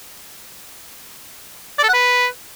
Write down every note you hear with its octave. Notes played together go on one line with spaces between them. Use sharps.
D5
A4
F#5
B4